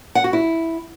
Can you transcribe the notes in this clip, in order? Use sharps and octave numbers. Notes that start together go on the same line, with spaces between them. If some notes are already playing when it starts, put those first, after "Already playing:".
F#5
F#4
E4